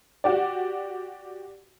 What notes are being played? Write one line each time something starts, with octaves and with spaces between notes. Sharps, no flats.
F#4 G4 D5